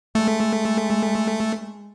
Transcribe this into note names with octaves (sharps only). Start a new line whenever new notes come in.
G#3 A3